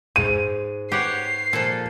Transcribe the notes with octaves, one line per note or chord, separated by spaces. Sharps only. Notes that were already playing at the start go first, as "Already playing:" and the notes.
G#2 D#7
G4 B4 C#5 F#5 C7
A#2 F3 A4